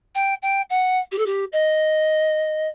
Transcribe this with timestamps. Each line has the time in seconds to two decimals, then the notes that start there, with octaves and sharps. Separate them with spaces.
0.15 G5
0.42 G5
0.69 F#5
1.11 G4
1.18 A4
1.26 G4
1.52 D#5